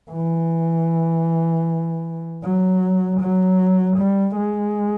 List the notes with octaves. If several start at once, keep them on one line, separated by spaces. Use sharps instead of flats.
E3
F#3
F#3
G3
G#3